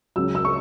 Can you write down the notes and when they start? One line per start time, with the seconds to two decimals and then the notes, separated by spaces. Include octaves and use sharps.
0.16 C#2 C#3 F#3 E6
0.35 E6
0.45 C#6